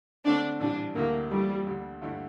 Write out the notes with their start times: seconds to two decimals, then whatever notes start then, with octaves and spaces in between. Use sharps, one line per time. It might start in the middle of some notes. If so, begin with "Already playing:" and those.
0.24 D3 A3 C4 D4
0.60 A#1 A2 E3 G3 D4
0.95 D2 D3 A3 A#3 E4 G4
1.31 F2 E3 G3 A3 D4
1.66 D2 D3 G3
2.02 G2 D3 A3 E4 G4